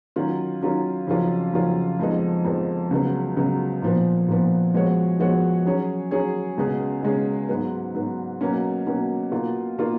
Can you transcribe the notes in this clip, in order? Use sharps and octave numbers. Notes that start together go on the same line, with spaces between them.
D#3 F#3 C#4 F4
D#3 F#3 C#4 F4
F2 C#3 F#3 C#4 F4
F2 C#3 F#3 C#4 F4
F2 F3 G#3 B3 D#4
F2 F3 G#3 B3 D#4
C#2 C#3 F#3 B3
C#2 C#3 F#3 B3
A#2 F3 B3
A#2 F3 B3
F3 G#3 B3 F#4 C#5
F3 G#3 B3 F#4 C#5
F#3 C#4 G#4 C#5
F#3 C#4 G#4 C#5
C#2 B2 G#3 C#4 G#4
C#2 B2 G#3 C#4 G#4
G#2 F#3 B3
G#2 F#3 B3
B2 F#3 A#3 C#4
B2 F#3 A#3 C#4
B2 A#3 F4
B2 A#3 F4